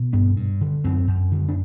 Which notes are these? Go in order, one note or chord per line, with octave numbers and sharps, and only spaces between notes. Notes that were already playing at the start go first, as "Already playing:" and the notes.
Already playing: B2
G2 B3
G2
D3
F#2 C4
F#2
D3
D4